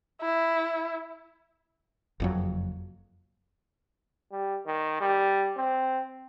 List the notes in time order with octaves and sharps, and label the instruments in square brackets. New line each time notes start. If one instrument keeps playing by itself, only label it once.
[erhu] E4
[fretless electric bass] F#1 F2 F#3
[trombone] G3
D#3
G3
C4